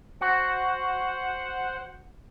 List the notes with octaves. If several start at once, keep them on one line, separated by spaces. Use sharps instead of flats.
F#4 C5 F#5